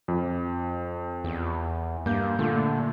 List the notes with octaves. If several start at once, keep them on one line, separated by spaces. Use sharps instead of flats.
F2
E2
G2 A#3 G6
A#2 D3 A3